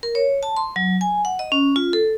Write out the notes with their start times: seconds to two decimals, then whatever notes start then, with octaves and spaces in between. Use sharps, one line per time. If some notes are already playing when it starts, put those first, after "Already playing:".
0.03 A#4
0.15 C#5
0.43 A5
0.56 C6
0.76 F#3
1.01 G#5
1.25 F#5
1.39 D#5
1.52 C#4
1.76 F4
1.93 A4